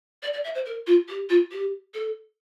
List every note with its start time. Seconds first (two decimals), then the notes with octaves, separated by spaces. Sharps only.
0.23 D5
0.33 D5
0.44 E5
0.55 C5
0.66 A#4
0.87 F4
1.08 G4
1.29 F4
1.51 G4
1.94 A4